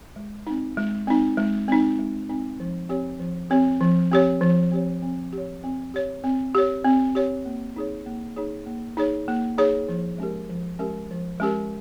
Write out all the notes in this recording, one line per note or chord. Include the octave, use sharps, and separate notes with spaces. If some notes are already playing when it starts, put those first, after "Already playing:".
G#3
C4 D#4
G#3
C4 D#4
G#3
C4 D#4
G#3
C4 D#4
F3
C4 G4 C#5
F3
C4 G4 C#5
F3
C4 G4 C#5
F3
C4 G4 C#5
C4
G4
C#5
C4
G4 C#5
C4
G4 C#5
C4
G4 C#5
A#3
D#4 G#4 C#5
A#3
D#4 G#4 C#5
A#3
D#4 G#4 C#5
A#3
D#4 G#4 C#5
F3
G#3 C#4 G4 A#4
F3
G#3 C#4 G4 A#4
F3
G#3 C#4 G4 A#4